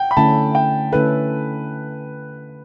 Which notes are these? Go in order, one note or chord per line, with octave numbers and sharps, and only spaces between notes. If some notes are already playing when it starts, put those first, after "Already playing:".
Already playing: F#5 G5
B5
D3 A3 C#4 E4 A4 A5
G5
D3 A3 C#4 E4 A4 B4